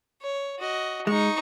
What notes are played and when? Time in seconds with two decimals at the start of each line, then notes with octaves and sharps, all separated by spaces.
0.22 C#5
0.59 F#4 D#5
1.07 G#3 D#4 C#6